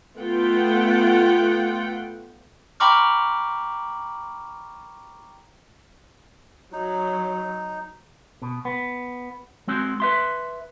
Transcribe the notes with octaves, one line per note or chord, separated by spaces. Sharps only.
A3 B3 F4 F#5 G5
G5 A#5 B5 C#6 D6 F6
F#3 D#4
B2
B3
G#3 C4 F#4
B4 E5 C6